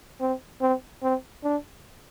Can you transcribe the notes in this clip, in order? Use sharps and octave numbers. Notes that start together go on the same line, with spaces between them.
C4
C4
C4
D4